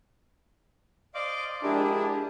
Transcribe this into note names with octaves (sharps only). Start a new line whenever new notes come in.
C5 D5 D#5 F5 D6
F3 G#3 D4 E4 G4 G#4 A#4